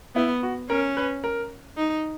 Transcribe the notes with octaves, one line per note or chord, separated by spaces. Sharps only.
B3 E4
F#4
C#4 A#4
B4
A#4
D#4